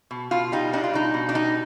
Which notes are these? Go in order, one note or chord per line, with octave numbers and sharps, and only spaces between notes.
B2
B2 F4
G3 D#4
D4 D#4
F4
B2 D#4
B2
D4
G3 D#4